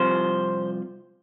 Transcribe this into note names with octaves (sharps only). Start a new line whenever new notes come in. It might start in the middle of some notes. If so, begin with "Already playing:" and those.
Already playing: C2 C3 F3 C5